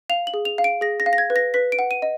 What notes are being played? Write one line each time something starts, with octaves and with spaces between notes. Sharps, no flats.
F5 F7
F#7
G#4
F7
F5
D7
G#4 A#6
A#6
F5
A#6
G#6
B4
A#6
B4 B6
D7
F#5
D#7
D#5